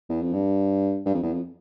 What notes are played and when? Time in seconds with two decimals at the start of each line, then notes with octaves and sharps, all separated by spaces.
0.09 E2
0.21 F2
0.33 G2
1.06 G2
1.14 F2
1.23 E2
1.32 F2